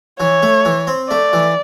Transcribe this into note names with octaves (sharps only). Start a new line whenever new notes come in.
E3 C#5
A3
E3
C4
A3 D5
E3